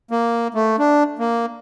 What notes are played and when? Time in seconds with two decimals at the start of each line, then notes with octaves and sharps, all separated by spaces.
0.11 A#3
0.54 A3
0.79 D4
1.19 A#3